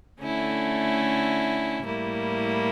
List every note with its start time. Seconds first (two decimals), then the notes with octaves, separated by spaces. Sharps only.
0.20 D3 A3 C#4 E4
1.84 A2 G3 A#3 E4